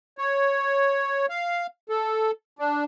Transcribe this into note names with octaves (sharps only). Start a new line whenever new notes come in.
C#5
F5
A4
D4